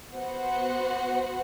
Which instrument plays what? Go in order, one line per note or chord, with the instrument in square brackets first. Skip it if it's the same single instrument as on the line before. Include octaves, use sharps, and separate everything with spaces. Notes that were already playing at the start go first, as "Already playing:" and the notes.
[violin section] B3 F#4 C5 F#5